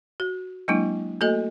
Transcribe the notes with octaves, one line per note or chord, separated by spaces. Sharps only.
F#4
F#3 G#3 A#3 D4 E4
A3 A#3 F#4 A4 D#5